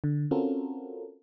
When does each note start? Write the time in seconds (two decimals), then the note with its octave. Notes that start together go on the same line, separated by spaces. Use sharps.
0.04 D3
0.31 C4 C#4 F4 F#4 A4 A#4